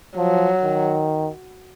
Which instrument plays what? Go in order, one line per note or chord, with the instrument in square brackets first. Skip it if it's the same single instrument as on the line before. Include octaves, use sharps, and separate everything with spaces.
[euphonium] F3 [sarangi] F#3
[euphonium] D#3